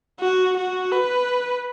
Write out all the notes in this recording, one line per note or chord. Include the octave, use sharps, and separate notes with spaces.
F#4
F#4
B4